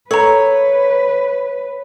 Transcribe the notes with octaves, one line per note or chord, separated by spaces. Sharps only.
A4 B4 C#5 A#5